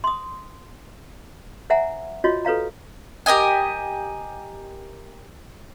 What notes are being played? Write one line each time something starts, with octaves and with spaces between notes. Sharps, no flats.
C6 D#6
C5 E5 F#5 G#5 A#5
F4 F#4 C5 C#5 D#5
A4 B4 C#5 F5 A#5
G4 A#4 D#5 G#5